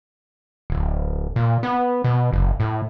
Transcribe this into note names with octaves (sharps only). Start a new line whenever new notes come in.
D1
A#2
B3
B2
F#1
A2